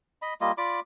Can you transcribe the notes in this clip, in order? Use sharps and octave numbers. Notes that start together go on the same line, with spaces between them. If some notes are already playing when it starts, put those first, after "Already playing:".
D#5 B5
G3 A#3 F4 D#5
F4 D5 B5 D6